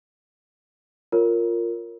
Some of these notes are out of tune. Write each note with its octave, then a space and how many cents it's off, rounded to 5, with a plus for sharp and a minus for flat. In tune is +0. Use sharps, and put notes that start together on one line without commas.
F4 +0 A#4 -15 C#5 +0